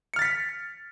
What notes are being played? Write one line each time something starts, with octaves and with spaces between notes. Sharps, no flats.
F6 A6 B6 C#7